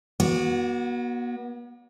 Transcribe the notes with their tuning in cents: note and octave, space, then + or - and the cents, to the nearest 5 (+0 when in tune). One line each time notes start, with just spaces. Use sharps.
B3 -45 F#4 +0 D5 -15